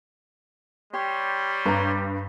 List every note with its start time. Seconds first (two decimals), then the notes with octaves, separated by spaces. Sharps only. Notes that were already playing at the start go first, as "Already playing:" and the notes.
0.94 G3 G4 C#5 C6
1.66 G2 B4 A#5